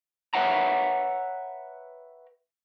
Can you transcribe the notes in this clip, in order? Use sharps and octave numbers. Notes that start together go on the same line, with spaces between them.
B4 C#5 E5 F#5 G5 A#5